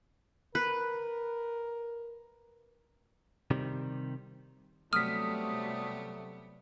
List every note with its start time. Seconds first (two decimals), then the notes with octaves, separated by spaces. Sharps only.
0.55 A#4 B4
3.51 C3 D#3 G3
4.93 C3 F#3 G3 A3 B3 D#6 F6 B6